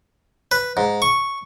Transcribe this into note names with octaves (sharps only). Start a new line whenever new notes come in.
B4
G#2
C#6